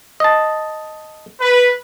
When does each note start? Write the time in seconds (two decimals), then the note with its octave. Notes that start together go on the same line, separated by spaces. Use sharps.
0.20 D#5 A5
1.41 B4